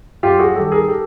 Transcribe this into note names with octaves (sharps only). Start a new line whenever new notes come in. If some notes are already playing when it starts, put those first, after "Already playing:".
F#2 F4 G4
F#4 G#4
D#3 G3 G4 A4
G#4 A#4
G4 A4